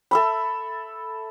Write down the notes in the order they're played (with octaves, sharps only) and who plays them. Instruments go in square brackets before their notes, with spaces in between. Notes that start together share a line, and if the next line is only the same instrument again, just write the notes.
[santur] A4 E5 B5